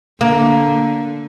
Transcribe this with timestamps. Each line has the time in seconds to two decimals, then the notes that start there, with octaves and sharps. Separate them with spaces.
0.21 D3 A#3